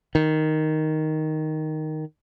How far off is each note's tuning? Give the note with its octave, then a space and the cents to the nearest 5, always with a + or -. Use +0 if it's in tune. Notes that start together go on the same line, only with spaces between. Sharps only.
D#3 +0